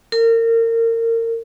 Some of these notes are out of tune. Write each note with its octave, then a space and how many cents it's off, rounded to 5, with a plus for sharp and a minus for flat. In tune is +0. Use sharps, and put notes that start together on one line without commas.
A#4 -30